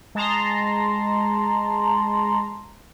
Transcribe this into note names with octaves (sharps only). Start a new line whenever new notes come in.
G#3 A5 A#5 C6